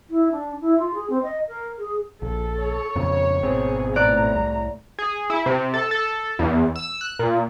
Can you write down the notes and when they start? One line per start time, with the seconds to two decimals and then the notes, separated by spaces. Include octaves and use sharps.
0.10 E4
0.31 D4
0.61 E4
0.78 F4
0.94 G#4
1.09 C4
1.23 D#5
1.48 A#4
1.78 G#4
2.22 A#1 A4
2.61 C#5
2.96 F2 A#2 C#3
3.42 G#1 B2 C4 G#4
3.96 A2 D5 A#5 F#6 D7
4.35 C2
4.99 G#4
5.30 E4
5.46 C3
5.74 A4
5.91 A4
6.39 E2
6.76 E6
7.01 F#6
7.19 A#2